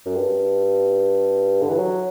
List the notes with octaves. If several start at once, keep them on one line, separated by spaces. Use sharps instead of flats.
F#2
G2
D3
E3
F#3